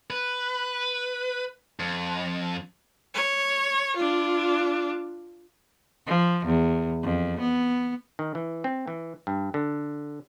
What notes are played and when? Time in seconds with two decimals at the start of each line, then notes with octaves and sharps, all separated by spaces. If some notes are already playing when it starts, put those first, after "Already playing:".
0.10 B4
1.80 F2
3.14 C#5
3.96 D4 F4
6.06 F3
6.46 E2
7.03 F2
7.40 B3
8.19 D#3
8.35 E3
8.64 C4
8.88 E3
9.27 G2
9.54 D3